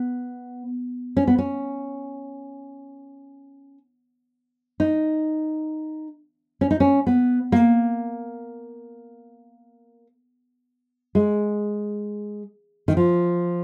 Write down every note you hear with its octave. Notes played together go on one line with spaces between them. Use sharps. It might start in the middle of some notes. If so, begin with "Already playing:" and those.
Already playing: B3
C#4
B3
C#4
D#4
C#4
D#4
C#4
B3
A#3
G#3
D#3
F3